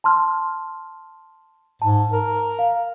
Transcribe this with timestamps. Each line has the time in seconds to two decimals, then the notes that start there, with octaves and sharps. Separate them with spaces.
0.04 A5 C6 F6
1.82 G#2 A5
2.12 A#4
2.59 F5